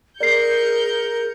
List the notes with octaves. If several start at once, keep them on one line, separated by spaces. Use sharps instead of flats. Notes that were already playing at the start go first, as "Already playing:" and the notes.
G#4 A#4 D5 G6 C7 C#7